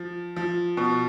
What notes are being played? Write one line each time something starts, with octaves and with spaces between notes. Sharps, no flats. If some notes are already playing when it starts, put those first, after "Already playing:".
Already playing: F3
F3
B2